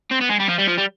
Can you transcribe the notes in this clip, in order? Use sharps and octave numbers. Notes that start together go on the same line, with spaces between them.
C4
B3
G#3
G3
F3
G3
F3
G3